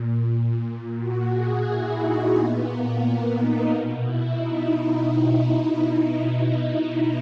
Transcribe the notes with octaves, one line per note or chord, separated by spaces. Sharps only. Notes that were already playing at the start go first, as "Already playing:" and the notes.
Already playing: A#2
A#2 F#4
G#4
E4
D#4
A#2 B3
A#3
B3
D#4
B2
E4
D#4
E4